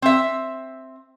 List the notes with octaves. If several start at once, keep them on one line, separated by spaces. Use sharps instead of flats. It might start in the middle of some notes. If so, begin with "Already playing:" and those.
C4 E5